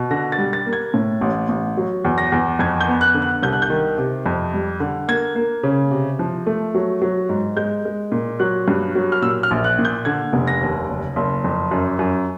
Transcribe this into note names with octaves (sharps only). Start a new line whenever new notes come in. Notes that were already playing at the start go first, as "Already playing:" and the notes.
Already playing: B2
D3 A#6
A6
G3
A6
A#3
G#6
A2
A1
A1
F#3
E2
A#6
E2
F2 G#6
G6
B3
F#6
D3
F#6
C2 G6
F#6
G6
D#3
C3
F2
G3
D3
A#3 G#6
A#3
C#3
C3
F3
A3
F#3
F#3
G#2
G#3 G6
G#3
A#2
F#3 F#6
G2
F#3
F6
A#2 E6
F6
A#1
F#6
A#2
G6
D3 G#6
F1
A#6
D#2
F#1
F#1
F2
F#2
F#2